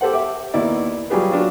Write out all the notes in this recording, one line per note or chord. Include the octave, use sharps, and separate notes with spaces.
G4 A4 C5 F#5
E5 F#5 D6
D#2 B3 E4 D5
F#3 G3 F4 G4 G#4 B4
F#3 D4 F4